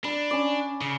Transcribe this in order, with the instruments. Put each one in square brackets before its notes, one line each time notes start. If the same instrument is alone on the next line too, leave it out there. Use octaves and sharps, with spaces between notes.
[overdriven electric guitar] D4 [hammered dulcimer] B5
[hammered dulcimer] C#4 D5
[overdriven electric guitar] C#3